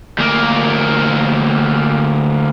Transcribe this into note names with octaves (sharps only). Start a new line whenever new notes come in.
D2 A#3